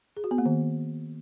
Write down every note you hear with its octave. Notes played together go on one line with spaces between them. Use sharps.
G#4
F#4
B3
A#3
D#3